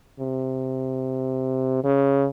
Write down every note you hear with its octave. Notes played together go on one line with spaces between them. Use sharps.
C3
C#3